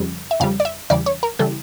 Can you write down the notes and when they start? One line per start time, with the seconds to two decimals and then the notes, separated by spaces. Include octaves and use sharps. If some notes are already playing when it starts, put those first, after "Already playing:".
Already playing: F2 C#3 G3
0.31 E5
0.40 F2 C#3 G3 F5
0.60 D5
0.65 E5
0.90 E2 C#3 E3 G3 D5
1.06 C#5
1.23 A#4
1.39 C#3 E3 G3 A4